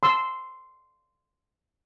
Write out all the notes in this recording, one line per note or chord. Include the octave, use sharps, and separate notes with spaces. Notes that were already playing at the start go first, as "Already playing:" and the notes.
C6 E6